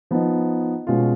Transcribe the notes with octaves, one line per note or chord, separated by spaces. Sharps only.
F3 B3 D#4
B2 G#3 C#4 F4